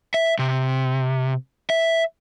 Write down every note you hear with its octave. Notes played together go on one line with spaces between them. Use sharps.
E5
C3
E5